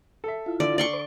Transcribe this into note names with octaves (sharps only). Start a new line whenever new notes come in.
A4 E5
E4 F4
D3 D5
D5 C6 C#6
C5 D6